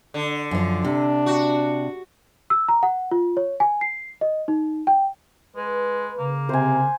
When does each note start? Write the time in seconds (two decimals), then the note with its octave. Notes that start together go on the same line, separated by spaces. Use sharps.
0.14 D3
0.51 F#2 F3
0.84 C3 D4
1.26 F#4
2.50 E6
2.69 A#5
2.83 F#5
3.11 F4
3.37 C#5
3.60 G#5
3.81 C7
4.21 D#5
4.48 D#4
4.87 G5
5.56 G#3 B4
6.19 C#3 A#3
6.49 C3 C5 G#5